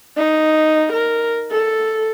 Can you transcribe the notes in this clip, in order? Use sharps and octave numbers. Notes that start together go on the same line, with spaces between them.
D#4
A#4
A4